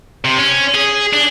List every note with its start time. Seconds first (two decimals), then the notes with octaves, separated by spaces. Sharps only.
0.25 C3
0.39 C#4
0.74 G#4
1.13 D4